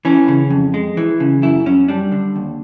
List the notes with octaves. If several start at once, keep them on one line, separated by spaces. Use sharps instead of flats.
E3 C#4
C#3
F2
G#3
E3
C#3
F#2 E4
F#2 C#4
G3 D4
D3
D#2